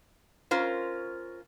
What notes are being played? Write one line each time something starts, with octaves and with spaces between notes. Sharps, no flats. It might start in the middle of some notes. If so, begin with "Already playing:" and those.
C#4 F4 A#4 C5